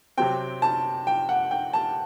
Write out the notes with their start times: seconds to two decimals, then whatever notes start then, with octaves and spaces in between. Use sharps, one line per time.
0.18 C3 F#3 C4 G5
0.62 A5
1.07 G5
1.29 F#5
1.51 G5
1.73 A5